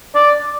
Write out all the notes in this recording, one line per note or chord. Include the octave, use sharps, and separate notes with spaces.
D5